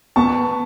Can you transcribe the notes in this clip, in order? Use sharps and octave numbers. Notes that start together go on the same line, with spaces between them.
B3 A5 C#6